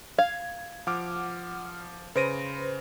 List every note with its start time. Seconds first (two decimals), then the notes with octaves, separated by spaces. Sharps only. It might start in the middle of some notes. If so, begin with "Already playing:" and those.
0.19 F5 G#6
0.87 F3 F#5 D6 F6
2.16 C#3 B4 C5 A#6 D7 D#7